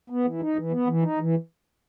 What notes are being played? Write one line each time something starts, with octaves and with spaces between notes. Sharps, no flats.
B3
E3
D#4
E3
B3
E3
D#4
E3